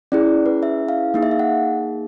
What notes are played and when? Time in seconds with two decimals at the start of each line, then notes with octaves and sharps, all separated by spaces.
0.12 C#4 E4 G#4 D5
0.46 B4
0.63 E5
0.89 F5
1.14 A#3 D#4 G#4
1.23 E5
1.31 F5
1.39 F#5